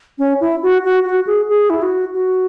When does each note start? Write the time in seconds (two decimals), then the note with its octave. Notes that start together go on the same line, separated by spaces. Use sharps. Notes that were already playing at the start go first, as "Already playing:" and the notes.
0.18 C#4
0.41 E4
0.63 F#4
0.84 F#4
1.05 F#4
1.27 G#4
1.49 G#4
1.70 E4
1.82 F#4
2.14 F#4